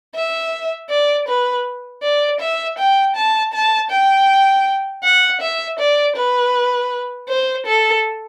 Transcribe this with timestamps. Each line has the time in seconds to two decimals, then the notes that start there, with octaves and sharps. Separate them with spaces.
0.15 E5
0.90 D5
1.28 B4
2.03 D5
2.40 E5
2.78 G5
3.16 A5
3.53 A5
3.91 G5
5.04 F#5
5.41 E5
5.79 D5
6.16 B4
7.29 C5
7.67 A4